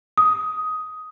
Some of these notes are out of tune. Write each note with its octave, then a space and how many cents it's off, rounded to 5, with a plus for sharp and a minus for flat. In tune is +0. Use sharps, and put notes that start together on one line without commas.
D#6 +10